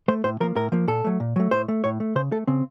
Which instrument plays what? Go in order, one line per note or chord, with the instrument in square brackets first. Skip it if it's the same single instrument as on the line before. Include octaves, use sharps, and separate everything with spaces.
[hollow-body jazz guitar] A3 C5
A2 C5
F3 A#3 A#4
A2 A#4
F3 A#3
A#2 A4
F#3 A3
A#2
F#3 A3
A2 C5
A3
A2 C#5
A3
C#3 C5
A3 A4
C#3 C4